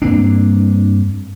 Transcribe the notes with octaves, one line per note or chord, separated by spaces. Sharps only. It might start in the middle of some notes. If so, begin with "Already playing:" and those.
G2 A#3 C4 D4